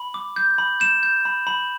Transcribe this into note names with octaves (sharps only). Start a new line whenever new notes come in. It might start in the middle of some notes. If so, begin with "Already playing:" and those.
Already playing: B5
D6
G6
B5
G6 E7
G6
B5
B5